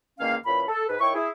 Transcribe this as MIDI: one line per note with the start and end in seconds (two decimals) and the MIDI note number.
0.19 0.36 40
0.19 0.36 51
0.19 0.36 56
0.19 0.36 58
0.19 0.36 61
0.19 0.36 77
0.46 0.63 46
0.46 0.63 52
0.46 0.63 61
0.46 0.63 83
0.68 0.87 69
0.89 0.96 44
0.89 0.96 71
1.01 1.12 51
1.01 1.12 64
1.01 1.12 73
1.01 1.12 79
1.01 1.12 85
1.15 1.29 64
1.15 1.29 68